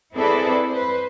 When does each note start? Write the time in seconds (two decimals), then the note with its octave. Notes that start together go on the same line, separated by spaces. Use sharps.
0.14 C4 E4 G#4 A4 B4 D5
0.70 B4 C5